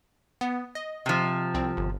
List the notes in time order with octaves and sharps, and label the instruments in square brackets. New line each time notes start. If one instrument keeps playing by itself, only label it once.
[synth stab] B3
D#5
[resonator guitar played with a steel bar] C3 F3
[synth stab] C2 C4
G1